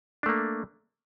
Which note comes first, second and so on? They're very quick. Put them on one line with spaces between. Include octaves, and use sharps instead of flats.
D4 A3 A#3